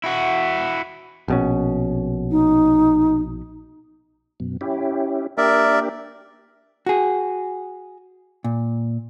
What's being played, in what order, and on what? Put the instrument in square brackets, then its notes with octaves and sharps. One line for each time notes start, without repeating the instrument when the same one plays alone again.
[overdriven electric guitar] E4 F#4
[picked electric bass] A#1 B2 C#4
[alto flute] D#4
[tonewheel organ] F#2 B2
C#4 E4 G4
[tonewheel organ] A#3 D4 G4 [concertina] A#4 D5 E5
[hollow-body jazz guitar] F#4 G#4
A#2